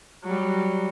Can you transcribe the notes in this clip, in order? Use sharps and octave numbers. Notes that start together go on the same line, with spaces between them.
F#3 G3